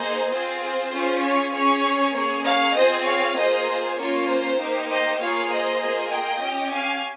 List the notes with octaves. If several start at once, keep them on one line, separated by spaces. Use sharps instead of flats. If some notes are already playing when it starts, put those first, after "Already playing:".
Already playing: A#3 D#4 G#4 C5 D#5
C4 F4 G#4 C5
C5
C#4 F4 G#4
C#5
C#4 G#4 C#5
A#3 C#4 G#4 C#5
C#5 F5
C4 F4 G#4 C5 D#5
C#5 F5
A#3 F4 G#4 C5 D#5
C5
A#3 C#4 F4 C#5
C5
A#3 D#4 G4
C5 D#5
A#3 F4 G#4 C#5 F5
C5 D#5
A#3 F4 G#4
D#5 G5
C#4
G4
F5 G#5